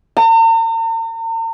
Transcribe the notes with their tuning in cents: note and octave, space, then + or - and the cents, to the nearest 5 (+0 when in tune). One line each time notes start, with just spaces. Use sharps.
A#5 -45